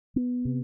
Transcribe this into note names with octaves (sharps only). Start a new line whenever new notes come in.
B3
C3